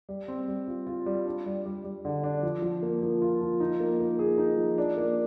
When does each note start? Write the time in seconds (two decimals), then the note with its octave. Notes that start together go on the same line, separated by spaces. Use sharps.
0.09 G3
0.28 C4
0.48 G3
0.68 F4
0.87 F4
1.06 G3
1.25 D4
1.46 G3
1.66 G3
1.84 G3
2.05 D3
2.24 D4
2.43 F3
2.62 F3
2.82 A#3
3.02 F3
3.22 F4
3.41 F3
3.60 D#4
3.80 A#3
4.00 A#3
4.19 G#4
4.38 D#4
4.57 F3
4.78 D4
4.97 A#3